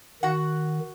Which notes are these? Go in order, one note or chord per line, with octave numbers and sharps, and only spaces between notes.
D#3 F#4 F#5